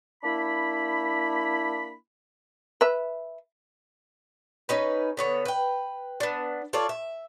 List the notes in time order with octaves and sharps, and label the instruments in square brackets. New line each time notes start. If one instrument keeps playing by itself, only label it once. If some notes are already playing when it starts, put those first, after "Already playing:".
[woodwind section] A#3 D4 E4 E5 B5
[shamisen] B4 E5
[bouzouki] C#4 D#4 B4
D3 B3 C#5
B4 G5
B3 D4
F4 A4 C#5 D5
E5